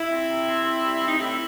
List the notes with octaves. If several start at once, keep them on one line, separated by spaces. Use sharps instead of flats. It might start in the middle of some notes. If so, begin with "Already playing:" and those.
Already playing: E4
C4
C3
C4
C4
G3
C4
D#4
A2 E4